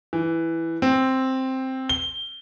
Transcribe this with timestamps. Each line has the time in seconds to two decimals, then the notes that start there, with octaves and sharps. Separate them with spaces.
0.13 E3
0.82 C4
1.89 G7